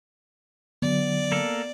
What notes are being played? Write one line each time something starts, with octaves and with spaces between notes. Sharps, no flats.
D3 F#3 B3 D5
A#3 A4